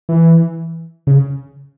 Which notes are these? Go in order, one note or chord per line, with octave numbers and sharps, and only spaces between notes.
E3
C#3